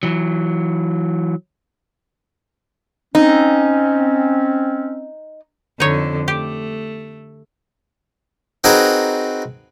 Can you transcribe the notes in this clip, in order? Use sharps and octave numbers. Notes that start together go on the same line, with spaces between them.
E3 F#3
C4 C#4 D#4
F2 D3 D#4 C#5
A3 G4
C4 D#4 F#4 G#4 A#4 B4